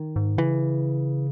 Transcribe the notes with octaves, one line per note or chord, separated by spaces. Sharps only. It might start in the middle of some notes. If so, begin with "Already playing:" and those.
Already playing: D#3
G#2
C#3 E3